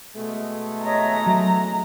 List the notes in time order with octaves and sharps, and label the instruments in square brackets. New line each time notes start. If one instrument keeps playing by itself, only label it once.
[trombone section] B2 G#3 A3
[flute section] C#5 D#5 E5 [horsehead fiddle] A#5
[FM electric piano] F#3 [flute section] E5